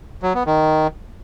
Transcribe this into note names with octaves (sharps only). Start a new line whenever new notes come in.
F#3
B3
D#3